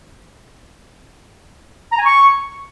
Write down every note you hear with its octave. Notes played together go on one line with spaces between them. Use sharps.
A#5
G#5
C#6